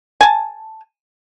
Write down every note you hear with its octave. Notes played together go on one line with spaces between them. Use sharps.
G#5 A5